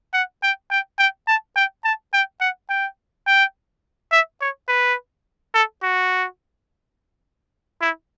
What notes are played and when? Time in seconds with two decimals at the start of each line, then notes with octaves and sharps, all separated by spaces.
0.13 F#5
0.43 G5
0.71 G5
0.99 G5
1.27 A5
1.56 G5
1.84 A5
2.13 G5
2.41 F#5
2.69 G5
3.27 G5
4.12 E5
4.41 C#5
4.68 B4
5.54 A4
5.83 F#4
7.81 E4